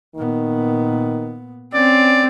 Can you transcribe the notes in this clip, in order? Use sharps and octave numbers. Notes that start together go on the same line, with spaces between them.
A#2 D#3 B3
C4 C#4 D5